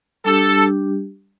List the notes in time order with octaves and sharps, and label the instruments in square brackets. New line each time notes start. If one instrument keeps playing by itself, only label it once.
[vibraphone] G3 D4 G4 [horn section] A4